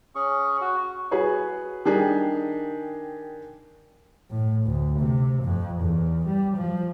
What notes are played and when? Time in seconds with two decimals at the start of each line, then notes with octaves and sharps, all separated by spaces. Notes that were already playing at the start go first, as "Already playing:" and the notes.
0.15 C#4 G#4 C#6
0.61 F#4
1.11 F#4 G#4 B4 C#5
1.85 D#3 D4 G4 G#4
4.30 A2
4.66 D2
4.99 C3
5.44 F2
5.82 E2
6.27 G3
6.57 F3